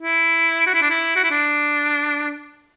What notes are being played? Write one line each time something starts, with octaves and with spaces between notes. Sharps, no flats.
E4
F#4
E4
D4
E4
F#4
E4
D4